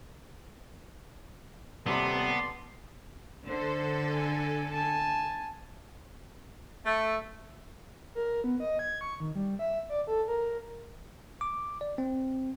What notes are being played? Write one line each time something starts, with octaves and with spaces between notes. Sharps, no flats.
D#1 C3 B3 D5 A5 C6 D6
D3 A4 C5
G#5
G#5 A5
A3
A#4
B3
D#5
G#6
C#6
D#3
G3
E5
D5
A4
A#4
D6
D5
C4